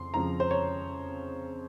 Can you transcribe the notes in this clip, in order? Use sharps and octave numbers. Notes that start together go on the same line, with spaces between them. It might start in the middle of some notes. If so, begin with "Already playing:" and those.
Already playing: F2 C#3 F3 C6
F2 C#3 F3 A#5
C5
C#5